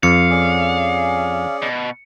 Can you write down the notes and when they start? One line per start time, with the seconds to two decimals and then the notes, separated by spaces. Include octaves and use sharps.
0.03 F2 F5 C#7
0.30 C#4 G#4 D5
1.62 B2